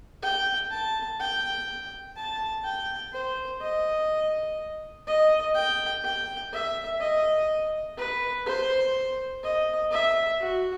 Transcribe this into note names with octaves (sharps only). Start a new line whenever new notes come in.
G5
A5
G5
A5
G5
C5
D#5
D#5
G5
G5
E5
D#5
B4
C5
D#5
E5
F#4